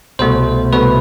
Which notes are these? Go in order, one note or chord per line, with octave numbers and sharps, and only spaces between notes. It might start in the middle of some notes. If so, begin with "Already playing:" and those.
C2 B2 A3 C5
C2 B2 A3 B4